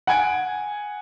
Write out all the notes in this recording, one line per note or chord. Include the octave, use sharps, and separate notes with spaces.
F#5 G#5 G#6 D7